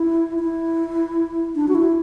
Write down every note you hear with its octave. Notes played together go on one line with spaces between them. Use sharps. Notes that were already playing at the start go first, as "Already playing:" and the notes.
Already playing: E4
E4
D4
F#4
E4